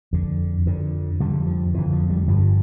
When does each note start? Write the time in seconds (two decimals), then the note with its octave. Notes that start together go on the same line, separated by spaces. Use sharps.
0.13 F2 D3
0.66 F2 D3
1.20 F2 D3 G3
1.47 F3
1.74 F2 D3 E3
1.92 F3
2.10 G3
2.28 G2 D3 F3